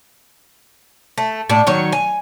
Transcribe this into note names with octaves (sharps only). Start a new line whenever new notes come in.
A3
A2 D4
D#3 F#3 C#5
G#5